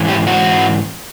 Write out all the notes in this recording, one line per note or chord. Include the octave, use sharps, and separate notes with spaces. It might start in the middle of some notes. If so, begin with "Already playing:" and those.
Already playing: G#2 E3
G4
F#4